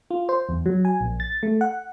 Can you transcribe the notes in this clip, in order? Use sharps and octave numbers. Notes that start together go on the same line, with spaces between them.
F4
C5
E2
F#3
G#5
A#1
A6
A3
F#5